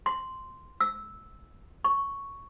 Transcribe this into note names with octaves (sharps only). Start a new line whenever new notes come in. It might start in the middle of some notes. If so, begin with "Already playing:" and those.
C6
E6
C#6